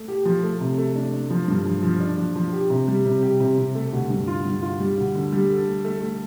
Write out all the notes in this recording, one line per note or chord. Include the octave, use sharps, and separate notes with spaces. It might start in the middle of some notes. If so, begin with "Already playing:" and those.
Already playing: A3
G4
F3
A3
C3
A3
D4
A3
F3
G2
F3
F3
D4
F3
F3
G4
C3
G3
C3
G4
C3
C3
A3
D2
G2
F4
G2
F4
G3
D2
D3
G3
A4
A3
A3
A3